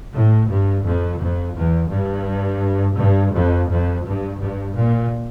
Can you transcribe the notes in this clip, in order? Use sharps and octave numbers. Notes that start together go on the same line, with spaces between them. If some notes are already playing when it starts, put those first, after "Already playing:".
A2
G2
F2
F2
E2
G2
G2
F2
F2
G2
G2
A#2